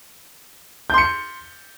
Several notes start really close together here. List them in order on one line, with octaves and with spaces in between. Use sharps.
G6 C6 C#7